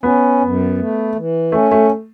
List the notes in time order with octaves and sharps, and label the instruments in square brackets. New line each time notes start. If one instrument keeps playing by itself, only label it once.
[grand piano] B3 [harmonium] C#4
[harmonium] F#2
A3
E3
[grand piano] A3 [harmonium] C#4
[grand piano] A3